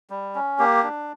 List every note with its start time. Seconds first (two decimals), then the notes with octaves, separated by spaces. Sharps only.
0.10 G3
0.35 C#4
0.59 A#3 G4
0.84 D4